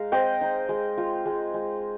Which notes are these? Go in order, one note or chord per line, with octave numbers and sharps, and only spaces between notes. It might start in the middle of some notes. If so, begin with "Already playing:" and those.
Already playing: G#3 D#4 F5
C4 D#5 G5
D#4
G#3
F4
G#3
G#3